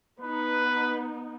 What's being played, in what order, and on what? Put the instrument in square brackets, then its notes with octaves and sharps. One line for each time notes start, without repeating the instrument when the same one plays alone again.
[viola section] B3 D#4 [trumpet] B4